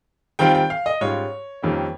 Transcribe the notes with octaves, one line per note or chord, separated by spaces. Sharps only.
D#3 G3 C4 F4 G5
G5
F5
D#5
G#2 G3 C#4 F4 C#5
F2 D#3 G3 A#3 C#4